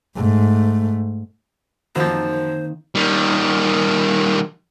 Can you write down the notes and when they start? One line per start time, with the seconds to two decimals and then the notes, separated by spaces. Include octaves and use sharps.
0.16 G#2 A3
1.95 F#2 D#3 F3 A#3 C4 C5
2.95 D#3 G3